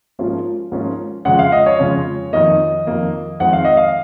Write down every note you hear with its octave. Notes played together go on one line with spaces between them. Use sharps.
G#2 F3 A#3 C#4 F4
G#2 F3 A#3 C#4 F4
F2 C#3 G#3 C#4 F4 F#5
F5
D#5
C#5
F2 C#3 G#3 C#4 F4
F2 D#3 A#3 D#5
F2 D#3 A#3
F2 D#3 G#3 C4 F#5
F5
D#5
F5